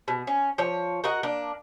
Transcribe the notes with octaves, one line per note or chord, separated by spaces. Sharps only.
B2
C#4
F3 C#5
F#4 A#4 D#5 F#5
A#3 D4